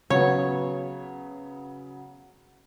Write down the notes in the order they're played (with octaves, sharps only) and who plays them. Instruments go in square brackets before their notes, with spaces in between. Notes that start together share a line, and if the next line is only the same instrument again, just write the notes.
[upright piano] C#3 F#3 B3 [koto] C#5